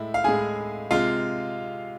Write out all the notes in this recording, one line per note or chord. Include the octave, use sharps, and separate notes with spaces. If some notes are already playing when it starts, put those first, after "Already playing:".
Already playing: A2 G#3 E4
F5
A2 G#3 G#4 G#5
C3 G#3 F4 F5